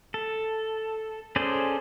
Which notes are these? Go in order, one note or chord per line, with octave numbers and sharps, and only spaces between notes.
A4
C#4 G#4 A4 C5 D5